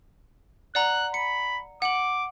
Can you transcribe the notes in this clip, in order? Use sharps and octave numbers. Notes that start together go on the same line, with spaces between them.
D5 F#5 A#5 F#6
B5 C#7
F#5 D6 F#7